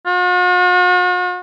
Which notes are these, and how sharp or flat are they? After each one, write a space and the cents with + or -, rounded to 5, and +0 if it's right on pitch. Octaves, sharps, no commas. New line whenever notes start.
F#4 -45